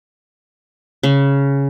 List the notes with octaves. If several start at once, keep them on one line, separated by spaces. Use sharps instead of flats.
C#3